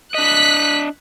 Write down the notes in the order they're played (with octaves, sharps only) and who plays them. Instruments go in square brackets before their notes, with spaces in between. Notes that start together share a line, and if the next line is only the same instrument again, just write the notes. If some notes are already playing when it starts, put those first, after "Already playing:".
[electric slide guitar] D4 D#5 [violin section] F#6 B6